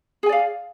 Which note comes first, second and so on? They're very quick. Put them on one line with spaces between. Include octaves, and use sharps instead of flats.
G#4 G#5 D5 F5